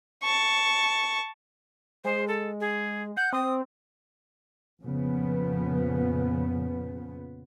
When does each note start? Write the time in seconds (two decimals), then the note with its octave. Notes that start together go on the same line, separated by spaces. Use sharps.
0.23 A5 C#6
2.04 G#3 C5
2.28 A4
2.60 G#4
3.17 F#5 G6
3.33 C4 D#6
4.83 F2 A#2 C#3 F3 B3